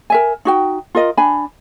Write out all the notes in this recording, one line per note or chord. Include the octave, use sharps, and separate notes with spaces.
A#4 E5 G#5
D#4 F#4 G5
F4 A#4 D#5
D4 G#5 B5